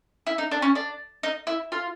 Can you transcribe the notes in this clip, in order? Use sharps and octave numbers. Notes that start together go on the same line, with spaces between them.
E4
D#4
D4
C#4
D4
D#4
E4
F4